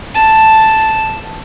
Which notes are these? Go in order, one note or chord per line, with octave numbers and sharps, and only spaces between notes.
A5